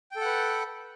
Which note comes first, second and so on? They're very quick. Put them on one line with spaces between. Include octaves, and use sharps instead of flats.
G5 A4 F#5 B4